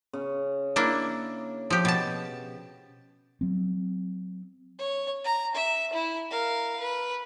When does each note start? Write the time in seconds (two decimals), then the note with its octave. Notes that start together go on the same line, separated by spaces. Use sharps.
0.13 C#3
0.76 A#3 D4 E4
1.70 F3 G4
1.85 B2 A5
3.41 F#3 C4
4.78 C#5
5.24 A#5
5.55 E5
5.93 E4
6.30 A#4 F5
6.80 B4